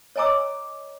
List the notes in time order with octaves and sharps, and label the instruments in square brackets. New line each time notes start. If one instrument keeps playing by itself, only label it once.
[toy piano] C#5 D#5 G#5 A#5 D6 E6